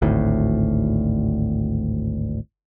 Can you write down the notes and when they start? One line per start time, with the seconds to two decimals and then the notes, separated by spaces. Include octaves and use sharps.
0.02 G#1 D2 A2